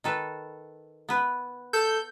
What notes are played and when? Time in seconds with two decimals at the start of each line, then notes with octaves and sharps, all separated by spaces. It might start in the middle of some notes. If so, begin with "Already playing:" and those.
0.04 D#3 A4 B4
1.09 B3 B4
1.73 A4 G6